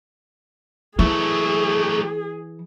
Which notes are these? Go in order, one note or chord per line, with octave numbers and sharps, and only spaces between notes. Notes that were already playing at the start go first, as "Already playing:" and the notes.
E3 F#3 A3 G#4